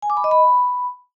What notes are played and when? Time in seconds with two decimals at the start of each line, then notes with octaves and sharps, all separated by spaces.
0.02 G#5
0.10 D6
0.17 B5
0.24 D#5
0.31 B5